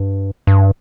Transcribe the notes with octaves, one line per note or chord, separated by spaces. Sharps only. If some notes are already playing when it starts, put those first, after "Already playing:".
Already playing: G2
G2